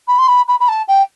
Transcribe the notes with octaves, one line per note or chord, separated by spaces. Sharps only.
B5
C6
B5
B5
B5
A5
G5